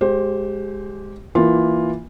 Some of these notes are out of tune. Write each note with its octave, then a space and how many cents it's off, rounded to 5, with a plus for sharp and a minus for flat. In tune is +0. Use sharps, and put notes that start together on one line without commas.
G#3 +0 G4 -20 C5 +15
E3 +0 A#3 +0 F4 +5